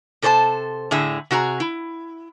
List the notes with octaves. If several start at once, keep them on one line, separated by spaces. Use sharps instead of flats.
C3 A4 C5 C#5 A5
A2 D3 G#4 E5
C3 F#4 G#4 A#5
E4